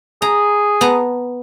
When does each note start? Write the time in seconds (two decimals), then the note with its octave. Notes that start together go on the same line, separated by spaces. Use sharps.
0.22 G#4 A#5
0.81 B3 A5 A#5